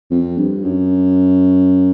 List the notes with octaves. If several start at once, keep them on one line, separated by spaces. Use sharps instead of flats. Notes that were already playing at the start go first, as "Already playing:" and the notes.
F2
G2
F#2